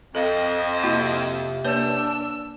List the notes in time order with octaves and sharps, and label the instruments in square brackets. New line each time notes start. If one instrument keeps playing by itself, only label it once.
[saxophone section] F2 [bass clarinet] C4 [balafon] A4 F5 [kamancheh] D#5
[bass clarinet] C3 [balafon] A#3 E4 F#4
[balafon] A#3 B4 C#5 [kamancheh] D4 E6